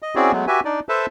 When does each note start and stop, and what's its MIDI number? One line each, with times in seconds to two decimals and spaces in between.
0.02 0.15 75
0.15 0.32 60
0.15 0.32 61
0.15 0.32 64
0.15 0.32 66
0.15 0.32 68
0.15 0.32 74
0.32 0.46 54
0.32 0.46 56
0.32 0.46 57
0.32 0.46 59
0.47 0.60 66
0.47 0.60 67
0.47 0.60 71
0.47 0.60 76
0.47 0.60 80
0.65 0.80 62
0.65 0.80 63
0.65 0.80 74
0.89 1.06 69
0.89 1.06 71
0.89 1.06 72
0.89 1.06 76
0.89 1.06 81